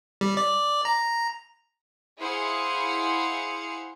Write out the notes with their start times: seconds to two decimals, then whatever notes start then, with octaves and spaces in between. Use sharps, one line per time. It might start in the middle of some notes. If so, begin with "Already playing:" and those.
0.21 G3
0.37 D5
0.85 A#5
2.19 E4 G#4 C5 F5 F#5 C#7